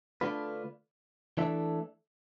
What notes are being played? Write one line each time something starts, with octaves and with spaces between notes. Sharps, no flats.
D3 A3 D4 F4 B4
E3 A3 D4 A4 E5